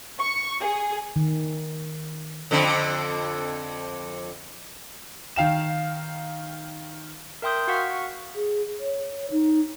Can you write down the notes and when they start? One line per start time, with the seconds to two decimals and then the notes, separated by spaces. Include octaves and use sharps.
0.19 C#6
0.60 G#4
1.16 D#3
2.51 F2 D3 C4
5.36 D#3 F5 G5 E7
7.42 A#4 E5 G5 C6 D#6 G6
7.67 F#4 F5 F#5 C#6 F6 B6
8.35 G#4
8.80 C#5
9.31 D#4